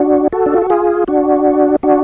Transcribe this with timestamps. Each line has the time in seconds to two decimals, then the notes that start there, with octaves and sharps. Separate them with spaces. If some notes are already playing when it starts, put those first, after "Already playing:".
Already playing: D4 F#4
0.33 F#4 A4
0.46 D4
0.54 F4
0.62 F#4
0.70 F4 G#4
1.08 D4 F#4
1.83 D4 F#4